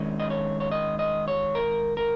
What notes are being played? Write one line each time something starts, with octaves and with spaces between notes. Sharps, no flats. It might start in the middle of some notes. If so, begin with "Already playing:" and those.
Already playing: D#3 G#3 C#4
D#5
C#5
C#5
D#5
D#5
C#5
A#4
A#4